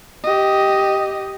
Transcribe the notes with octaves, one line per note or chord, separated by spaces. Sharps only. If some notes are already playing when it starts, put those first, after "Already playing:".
G4 D#5